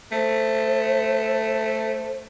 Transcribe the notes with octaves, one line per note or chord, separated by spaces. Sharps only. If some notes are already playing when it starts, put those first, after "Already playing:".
A3 C5